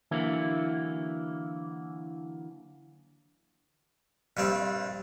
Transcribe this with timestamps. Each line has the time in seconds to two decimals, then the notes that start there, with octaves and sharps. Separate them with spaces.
0.11 D3 E3 F#3 A#3 E4
4.37 A#1 G2 G3 C4